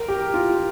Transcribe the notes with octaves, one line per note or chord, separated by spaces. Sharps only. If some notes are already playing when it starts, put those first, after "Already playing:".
Already playing: A#4
G4
F4